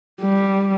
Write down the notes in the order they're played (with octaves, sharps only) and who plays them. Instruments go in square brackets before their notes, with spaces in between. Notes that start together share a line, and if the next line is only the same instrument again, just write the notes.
[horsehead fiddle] G3